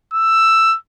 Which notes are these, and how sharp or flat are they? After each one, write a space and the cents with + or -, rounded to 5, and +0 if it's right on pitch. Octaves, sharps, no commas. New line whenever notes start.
E6 +10